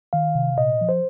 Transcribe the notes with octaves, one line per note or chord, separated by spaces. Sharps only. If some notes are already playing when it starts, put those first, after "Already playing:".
D#3 F5
C3
A#2 D#5
F3
C5